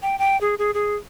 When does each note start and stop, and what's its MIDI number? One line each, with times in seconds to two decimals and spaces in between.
0.02 0.19 79
0.19 0.40 79
0.41 0.55 68
0.59 0.74 68
0.74 0.95 68